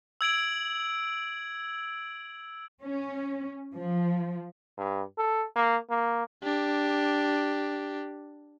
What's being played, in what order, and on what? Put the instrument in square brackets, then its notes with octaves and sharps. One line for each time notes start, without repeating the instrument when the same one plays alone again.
[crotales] E6 G#6 D7 F#7
[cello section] C#4
F3
[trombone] G2
A4
A#3
A#3
[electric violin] D4 G4